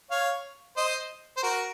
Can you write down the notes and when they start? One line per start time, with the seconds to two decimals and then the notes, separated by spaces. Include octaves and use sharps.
0.11 C#5 F5
0.77 C5 D#5
1.37 C5
1.43 F#4 A#4